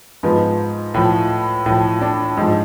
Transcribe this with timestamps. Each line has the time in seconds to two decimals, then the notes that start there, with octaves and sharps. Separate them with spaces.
0.23 G#2 F3 B3
0.94 A2 F3
1.66 A2 F3
2.01 D4
2.37 G#2 F3